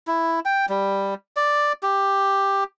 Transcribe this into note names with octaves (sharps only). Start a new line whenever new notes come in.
E4
G5
G3
D5
G4